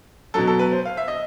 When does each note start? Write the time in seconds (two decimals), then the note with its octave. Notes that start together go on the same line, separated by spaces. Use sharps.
0.34 B2 F#3 A4
0.47 A4
0.59 B4
0.73 C5
0.85 F5
0.97 E5
1.08 D#5